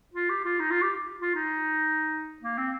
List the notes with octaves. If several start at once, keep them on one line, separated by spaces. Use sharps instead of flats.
F4
G4
F4
D#4
F4
G4
F4
D#4
A#3
C4